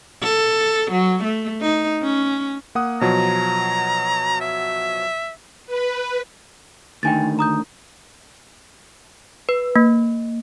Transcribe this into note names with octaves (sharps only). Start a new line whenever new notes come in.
A4
F#3
A3
D#4
C#4
A#3 F#5 D#6
B2 F3 F#3 A#5
E5
B4
D2 D#3 G5 G#5 A6
A#5 D#6 G6
B4
A#3